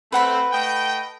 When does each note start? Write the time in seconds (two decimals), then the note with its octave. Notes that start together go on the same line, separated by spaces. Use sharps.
0.12 A3 C4 B4 F#5 B5
0.51 A3 D#5 G5